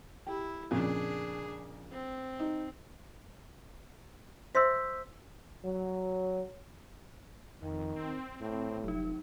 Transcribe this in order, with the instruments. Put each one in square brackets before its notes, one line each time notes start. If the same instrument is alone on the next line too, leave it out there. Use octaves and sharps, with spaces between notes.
[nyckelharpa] E4 [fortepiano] G4
[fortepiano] F2 A#2 C#3 [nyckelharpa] D4 G#4
[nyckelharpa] C4
[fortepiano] D#4
[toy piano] C5 E5 C6 [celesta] E6 G6 B6
[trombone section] F#3
[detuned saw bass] F2 [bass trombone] D#3
[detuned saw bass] C4
[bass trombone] A2
[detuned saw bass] F1 [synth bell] F#3 D#4